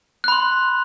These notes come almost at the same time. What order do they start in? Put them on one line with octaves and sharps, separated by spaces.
F#6 B5 C6